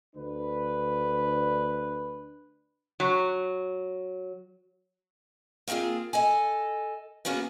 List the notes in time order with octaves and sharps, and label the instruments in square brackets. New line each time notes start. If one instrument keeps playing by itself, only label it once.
[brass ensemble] D2 D4 B4
[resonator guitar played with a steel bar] F#3
[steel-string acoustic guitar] A#3 C4 D4 F4 G#4
A4 D#5 G#5
A#3 B3 C#4 F#4 G#4